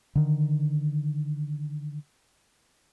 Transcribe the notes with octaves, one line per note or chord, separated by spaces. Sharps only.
D3 D#3